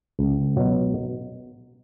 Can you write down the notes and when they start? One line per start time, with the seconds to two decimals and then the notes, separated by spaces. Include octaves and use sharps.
0.19 C#2
0.56 B2 F#3